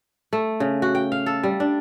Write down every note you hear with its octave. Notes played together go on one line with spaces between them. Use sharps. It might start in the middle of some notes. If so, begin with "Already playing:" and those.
A3
C#3
F#4
G5
F5
A4
G3
D4